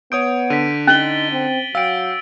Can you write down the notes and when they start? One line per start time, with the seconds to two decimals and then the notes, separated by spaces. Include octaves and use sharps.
0.12 B3 C#5 D#6 G6 D7
0.50 D3 B6 D#7
0.87 C#4 D#4 A6 F#7 G7
1.32 C4
1.75 F#3 F5 G5 E6 D7